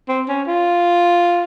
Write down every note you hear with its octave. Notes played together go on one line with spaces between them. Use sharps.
C4
C#4
F4